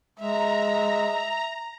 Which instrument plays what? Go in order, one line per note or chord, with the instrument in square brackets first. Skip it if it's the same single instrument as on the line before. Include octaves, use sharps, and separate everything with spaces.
[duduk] G#3 [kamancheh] E5 [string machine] A#5